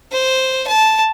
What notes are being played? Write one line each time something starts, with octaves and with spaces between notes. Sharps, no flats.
C5
A5